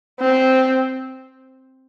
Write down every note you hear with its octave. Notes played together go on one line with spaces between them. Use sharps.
C4